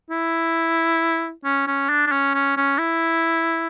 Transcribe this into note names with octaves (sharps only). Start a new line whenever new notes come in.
E4
C#4
C#4
D4
D4
C#4
C#4
C#4
E4